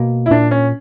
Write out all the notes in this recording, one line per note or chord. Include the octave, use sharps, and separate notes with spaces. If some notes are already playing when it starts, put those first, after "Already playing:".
Already playing: B2 A#3
E4
A#2 D4
C#4